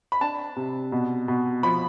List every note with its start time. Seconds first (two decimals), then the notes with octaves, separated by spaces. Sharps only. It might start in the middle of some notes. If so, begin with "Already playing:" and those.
0.12 B5
0.21 D4 A5
0.56 C3
0.92 B2
1.28 B2
1.63 F3 B5